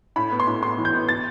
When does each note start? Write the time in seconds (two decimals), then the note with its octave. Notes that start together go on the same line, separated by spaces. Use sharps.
0.16 A2 B5
0.32 B3
0.40 C6
0.47 A2
0.62 B3 C6
0.78 E3
0.85 G6
0.93 B3
1.09 A6